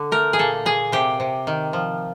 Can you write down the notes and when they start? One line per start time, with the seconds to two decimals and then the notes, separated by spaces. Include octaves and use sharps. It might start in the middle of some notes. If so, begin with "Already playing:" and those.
Already playing: D3
0.12 A3 A#4
0.33 G#4
0.39 A#2 A4
0.65 A#2 G#4
0.92 C3 G4
1.20 C3
1.47 D#3
1.73 F3